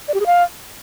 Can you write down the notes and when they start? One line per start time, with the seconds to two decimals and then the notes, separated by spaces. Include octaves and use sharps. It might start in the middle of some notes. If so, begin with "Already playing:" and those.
0.08 D5
0.14 G4
0.20 G#4
0.26 F5